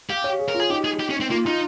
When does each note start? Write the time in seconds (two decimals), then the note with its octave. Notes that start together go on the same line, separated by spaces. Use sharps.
0.10 G4 F5
0.24 C#5
0.39 G#4
0.48 A#4
0.55 F4
0.60 G#4
0.70 D#4 G4
0.85 G#4
1.00 G4
1.10 C#4
1.20 C4
1.30 A#3 F4
1.46 D#4 F4